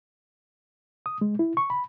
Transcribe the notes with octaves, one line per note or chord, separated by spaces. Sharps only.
D#6
G#3
E4
C#6
B5